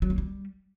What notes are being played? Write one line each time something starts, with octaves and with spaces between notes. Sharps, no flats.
F#3
A#3
G3